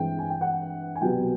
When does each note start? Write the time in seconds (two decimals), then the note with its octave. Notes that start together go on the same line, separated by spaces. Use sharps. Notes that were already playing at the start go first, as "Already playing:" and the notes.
Already playing: G2 E3 G#3 C4 G5
0.19 G#5
0.30 G5
0.41 F#5
0.95 G#5
1.01 C2 B2 F#3 B3 G5